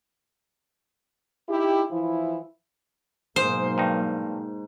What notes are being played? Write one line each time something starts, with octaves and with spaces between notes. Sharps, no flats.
D#4 E4 G4
E3 F3 E4
G#2 B2 F#3 A#3 C5
G2 D#4